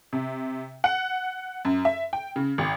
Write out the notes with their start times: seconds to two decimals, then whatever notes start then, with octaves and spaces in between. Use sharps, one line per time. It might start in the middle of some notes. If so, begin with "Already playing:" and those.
0.13 C3
0.84 F#5
1.65 F#2
1.85 E5
2.13 G5
2.36 C#3
2.58 G#1